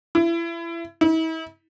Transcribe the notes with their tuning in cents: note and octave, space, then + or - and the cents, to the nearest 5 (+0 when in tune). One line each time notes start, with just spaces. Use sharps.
E4 +30
E4 -40